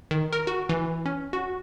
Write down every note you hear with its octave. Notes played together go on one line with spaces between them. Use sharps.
D#3
A#4
F#4
E3
C#4
F#4